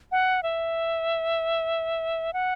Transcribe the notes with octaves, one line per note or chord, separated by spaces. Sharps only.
F#5
E5
F#5